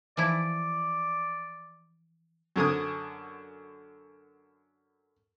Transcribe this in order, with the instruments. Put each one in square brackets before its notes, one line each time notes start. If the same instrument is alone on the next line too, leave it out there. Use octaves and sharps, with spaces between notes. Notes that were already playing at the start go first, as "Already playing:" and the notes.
[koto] E3 F3 E4 [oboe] D5
[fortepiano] F#2 D3 G#5 D#6